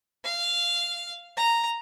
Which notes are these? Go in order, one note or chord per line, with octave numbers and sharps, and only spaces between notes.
F5
A#5